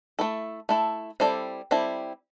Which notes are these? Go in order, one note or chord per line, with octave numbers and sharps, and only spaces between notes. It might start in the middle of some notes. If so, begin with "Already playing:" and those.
A3 E4 A4
A3 E4 A4
G3 C4 E4 A4 D5
G3 C4 E4 A4 D5